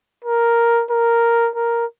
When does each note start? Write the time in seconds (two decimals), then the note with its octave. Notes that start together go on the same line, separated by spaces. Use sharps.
0.24 A#4
0.91 A#4
1.56 A#4